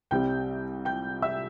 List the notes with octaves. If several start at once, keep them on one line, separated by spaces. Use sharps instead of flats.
C2 C3 G3 C4 G5 G6
G5 G6
E5 E6